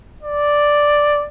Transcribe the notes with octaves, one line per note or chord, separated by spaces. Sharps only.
D5